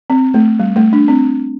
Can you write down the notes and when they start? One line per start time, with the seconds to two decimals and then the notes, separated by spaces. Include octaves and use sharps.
0.10 C4
0.34 A3
0.59 G3
0.76 A3
0.93 D4
1.08 C4